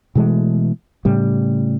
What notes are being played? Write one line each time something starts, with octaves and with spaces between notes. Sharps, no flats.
B2 E3 G#3 A3
A2 C#3 G3